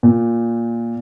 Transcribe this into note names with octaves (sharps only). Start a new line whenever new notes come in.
A#2